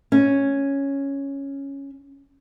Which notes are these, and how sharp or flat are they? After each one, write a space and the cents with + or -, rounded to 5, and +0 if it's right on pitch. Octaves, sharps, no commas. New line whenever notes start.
C#4 +0